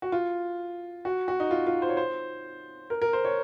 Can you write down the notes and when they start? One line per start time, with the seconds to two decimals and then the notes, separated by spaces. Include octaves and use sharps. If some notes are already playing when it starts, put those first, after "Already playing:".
0.02 F#4
0.12 F4
1.05 F#4
1.28 F#4
1.40 D#4
1.51 F4
1.67 F4
1.82 C5
1.89 C#5
1.97 C5
2.90 A#4
3.02 A#4
3.13 C5
3.25 C#5